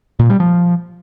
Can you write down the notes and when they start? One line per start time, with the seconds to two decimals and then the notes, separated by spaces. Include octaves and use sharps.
0.19 A#2
0.30 G3
0.40 F3